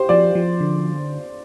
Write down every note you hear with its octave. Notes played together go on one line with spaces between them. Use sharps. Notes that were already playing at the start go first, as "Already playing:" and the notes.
Already playing: G4 C5
F3 D5
F3
D3